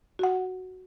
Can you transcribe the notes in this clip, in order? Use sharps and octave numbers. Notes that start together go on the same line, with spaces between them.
F#4 F#5